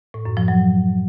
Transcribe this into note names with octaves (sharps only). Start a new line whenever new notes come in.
A2
F#2
F3
F#3